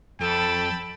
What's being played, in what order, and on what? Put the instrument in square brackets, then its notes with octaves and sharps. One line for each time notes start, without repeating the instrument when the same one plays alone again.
[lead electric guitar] F2 [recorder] A4 [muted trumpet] G5 [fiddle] A5 B5